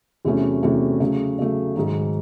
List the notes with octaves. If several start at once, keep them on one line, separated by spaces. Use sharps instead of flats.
E2 C3 F#3 A3 C#4
E2 C3 F#3 A3 C#4
C#3 F#3 A3
C#3 F#3 A3
G#2 D#3 F#3